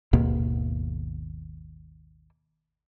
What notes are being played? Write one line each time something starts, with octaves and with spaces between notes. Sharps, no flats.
G#1 D#2 B2 A#3